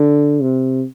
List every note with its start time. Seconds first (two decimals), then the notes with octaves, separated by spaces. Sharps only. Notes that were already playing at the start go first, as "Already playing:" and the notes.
Already playing: D3
0.41 C3